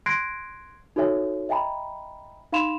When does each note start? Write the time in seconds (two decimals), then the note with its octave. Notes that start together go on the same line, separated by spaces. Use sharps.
0.06 C6 F#6 G#6 A#6 C7 D7
0.96 D#4 F#4 A4 C#5 E5 G#5
1.49 D#5 E5 G5 G#5 A#5 B5
2.52 D#4 F5 B5 C6 E7 F7